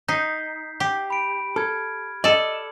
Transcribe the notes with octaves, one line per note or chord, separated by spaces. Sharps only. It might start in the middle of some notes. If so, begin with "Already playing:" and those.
D#4 G6 B6 C7
G4
B5 D7
A4 F6 G#6
A4 D5 D#5